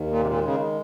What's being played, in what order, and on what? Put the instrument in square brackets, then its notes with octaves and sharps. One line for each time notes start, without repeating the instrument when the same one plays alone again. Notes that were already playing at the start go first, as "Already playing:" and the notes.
Already playing: [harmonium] D#2 D#3
[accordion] A#2
C3
[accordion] A#2 [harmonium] G#3
[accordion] C#3